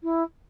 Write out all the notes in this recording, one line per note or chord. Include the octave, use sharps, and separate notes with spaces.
E4